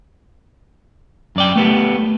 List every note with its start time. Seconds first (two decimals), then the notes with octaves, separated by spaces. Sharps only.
1.36 F#2 D5 G5
1.56 A3 B3 G4